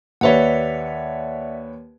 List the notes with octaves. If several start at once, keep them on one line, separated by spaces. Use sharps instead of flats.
D#2 B4 C#5 D5 E5 F#5